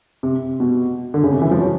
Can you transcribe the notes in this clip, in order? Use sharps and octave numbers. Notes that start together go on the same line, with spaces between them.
C3
B2
D3
C#3
C3
E3
F3
F#3